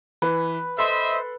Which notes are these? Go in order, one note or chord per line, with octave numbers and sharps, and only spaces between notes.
E3 B4
A4 C5 D#5 E5 B5 C6